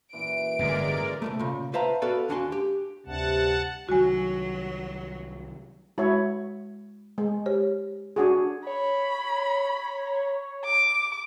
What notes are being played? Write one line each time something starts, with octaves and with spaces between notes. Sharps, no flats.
F#2 A#2 E3 D7
G1 A2 C#3 G#3 A#4 D5
C2 G#2 A3
A#2 C#3
B4 C5 E5 F5 A5 A#5
B3 F#4 A4 B4 D5 F5
D#2 D4 F#4 G#5 A5 C6
G4
D2 G2 C3 F#5 A5
C2 D#3 F#3 F#4 G#5
G#3 E4 F#4 C#5
G#3
G4 C5 C#5
D4 F#4 G#4
C#5 B5
D6